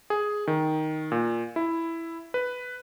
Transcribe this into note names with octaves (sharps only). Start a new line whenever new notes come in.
G#4
D#3
A#2
E4
B4